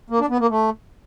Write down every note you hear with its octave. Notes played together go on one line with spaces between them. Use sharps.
A#3
D4
B3
A#3
A3